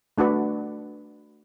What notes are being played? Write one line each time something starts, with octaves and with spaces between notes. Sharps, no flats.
A3 D4 F#4 B4